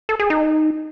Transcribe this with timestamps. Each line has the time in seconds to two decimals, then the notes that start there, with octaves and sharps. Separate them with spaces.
0.09 A4
0.19 G#4
0.30 D#4